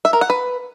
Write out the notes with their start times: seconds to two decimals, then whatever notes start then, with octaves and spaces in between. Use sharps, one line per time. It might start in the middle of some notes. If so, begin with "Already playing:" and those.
0.05 E5
0.13 A#4
0.21 F#5
0.30 B4